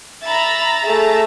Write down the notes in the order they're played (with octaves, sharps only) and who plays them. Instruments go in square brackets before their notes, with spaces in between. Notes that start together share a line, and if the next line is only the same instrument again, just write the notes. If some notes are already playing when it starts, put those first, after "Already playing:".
[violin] E5 B5 [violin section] A#5 A6
[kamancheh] A3 G#4 [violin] E5